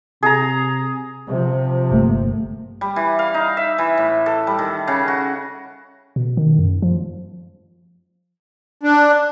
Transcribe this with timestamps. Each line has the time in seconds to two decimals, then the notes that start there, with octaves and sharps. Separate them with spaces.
0.23 C3 G#4 A#5
1.29 C3 F3
1.92 G1 A3 A#3
2.81 G3
2.96 E3
3.19 F5
3.34 D#4
3.57 E5
3.78 E3
3.98 A2
4.26 A4
4.47 G3
4.59 D#3
4.88 C#3
5.08 F#4
6.16 B2
6.37 D#3
6.59 F#2
6.82 F3
8.83 D4